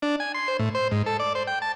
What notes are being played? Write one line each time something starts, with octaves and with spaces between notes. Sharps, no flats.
D4
G#5
C6
C5
A2
C5
G#2
A4
D5
C5
G5
A5